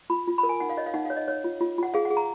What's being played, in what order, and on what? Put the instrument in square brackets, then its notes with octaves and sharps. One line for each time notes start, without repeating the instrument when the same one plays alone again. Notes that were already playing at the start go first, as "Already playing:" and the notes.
[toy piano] F4 B5
F4
B5
A#4
G#5
D#4 F#5
F5
C#5 D#5
F5
D#4 F#5
C#5 F5
D#5
C#5
F4
F4
F4 F#5
G#4 F5
F#5
G#4
A#5